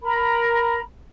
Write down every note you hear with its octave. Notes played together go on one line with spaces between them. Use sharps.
A#4 A#5 B5